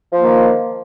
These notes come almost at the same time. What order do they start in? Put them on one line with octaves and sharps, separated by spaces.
F3 A#3 D#3